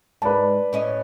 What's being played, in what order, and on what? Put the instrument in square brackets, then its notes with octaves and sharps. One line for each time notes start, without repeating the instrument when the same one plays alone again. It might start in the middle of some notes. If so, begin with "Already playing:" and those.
[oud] G#2 [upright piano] B4 D5 A5
[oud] A2 C#4 D#5